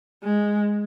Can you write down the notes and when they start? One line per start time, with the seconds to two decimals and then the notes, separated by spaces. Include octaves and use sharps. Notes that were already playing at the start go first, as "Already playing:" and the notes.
0.23 G#3